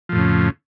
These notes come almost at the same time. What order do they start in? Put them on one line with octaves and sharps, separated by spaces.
F3 A2 F2 C#3